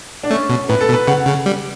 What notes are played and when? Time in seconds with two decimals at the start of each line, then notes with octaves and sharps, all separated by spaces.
0.23 D4
0.30 A3 C#4
0.50 B2
0.69 A2 B4
0.81 A4
0.89 B2
0.93 B4
1.08 C#3 F#5
1.27 C#3
1.46 G3